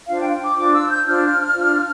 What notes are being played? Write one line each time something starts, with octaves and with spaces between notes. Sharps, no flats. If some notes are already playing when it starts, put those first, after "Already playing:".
D4 F4 C5 F5
G5
D6
D4 F4 C5 D6
E6
G6
D4 F4 C5 F6
D4 F4 C5